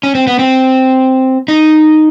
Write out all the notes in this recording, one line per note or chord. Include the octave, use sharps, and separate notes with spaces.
C#4
C4
B3
C4
D#4